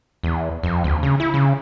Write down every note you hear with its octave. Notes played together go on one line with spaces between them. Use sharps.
E2
F2
D2
C#3
E4
C#3